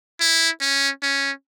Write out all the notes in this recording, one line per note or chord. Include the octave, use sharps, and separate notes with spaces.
E4
C#4
C#4